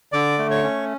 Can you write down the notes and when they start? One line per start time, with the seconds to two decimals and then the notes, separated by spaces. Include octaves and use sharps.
0.12 D3 D5 D6
0.39 A3
0.50 C#5 C#6
0.63 C#4